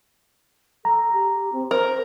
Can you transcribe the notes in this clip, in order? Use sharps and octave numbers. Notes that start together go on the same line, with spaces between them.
A4 A#5
G4
C4
A#4 C5